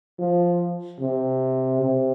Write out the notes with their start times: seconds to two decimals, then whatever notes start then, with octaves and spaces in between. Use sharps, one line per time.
0.19 F3
1.01 C3
1.82 C3